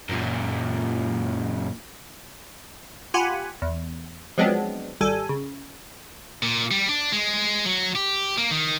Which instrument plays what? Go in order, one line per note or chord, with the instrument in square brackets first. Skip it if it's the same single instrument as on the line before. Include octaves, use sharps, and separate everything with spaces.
[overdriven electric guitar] F#2 A#2
[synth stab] F4 G4 F#5 G#5 B5
E2
F3 F#3 G#3 B3 C4 D4
G#1 G3 A4 G#5
C#3
[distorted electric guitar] A#2
G3
D4
G#3
F#3
G4
A#3
D#3